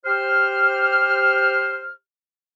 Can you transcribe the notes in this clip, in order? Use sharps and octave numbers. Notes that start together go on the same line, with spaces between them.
G4 C5 F6